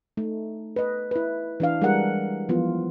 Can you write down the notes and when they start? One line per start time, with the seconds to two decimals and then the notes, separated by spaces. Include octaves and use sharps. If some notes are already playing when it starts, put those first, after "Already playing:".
0.17 A3 D#4
0.76 B4 D#5
1.11 E4 B4
1.60 E3 D4 F5
1.82 G3 G#3 D4 G#4 A#4 F#5
2.49 E3 F3 B3 F4